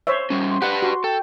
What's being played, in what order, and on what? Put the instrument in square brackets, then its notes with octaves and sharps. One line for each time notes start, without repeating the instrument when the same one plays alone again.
[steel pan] C5 C#5 E5
[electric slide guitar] G3 C#4
[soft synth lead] C6
[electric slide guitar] G4 B4 D5 [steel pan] F#5
[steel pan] F#4
[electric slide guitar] A4 [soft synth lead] G5